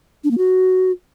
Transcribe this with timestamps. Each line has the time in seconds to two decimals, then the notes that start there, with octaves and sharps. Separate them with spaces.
0.24 D4
0.31 A#3
0.38 F#4